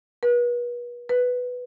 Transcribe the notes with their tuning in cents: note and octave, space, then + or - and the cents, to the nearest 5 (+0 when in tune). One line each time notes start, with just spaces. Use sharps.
B4 -40
B4 +5